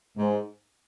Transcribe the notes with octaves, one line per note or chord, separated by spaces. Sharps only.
G#2